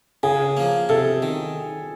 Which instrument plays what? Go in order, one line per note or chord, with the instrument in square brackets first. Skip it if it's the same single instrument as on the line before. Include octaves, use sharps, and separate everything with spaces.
[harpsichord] C#3 [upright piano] G#4
[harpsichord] F3 A#3
[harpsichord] C3 [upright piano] A4
[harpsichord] D#3